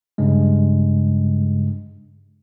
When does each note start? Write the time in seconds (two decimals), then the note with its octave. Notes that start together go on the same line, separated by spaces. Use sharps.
0.18 G2 C#3 G#3